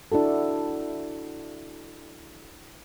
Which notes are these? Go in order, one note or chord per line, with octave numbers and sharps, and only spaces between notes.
D4 E4 F#4 A4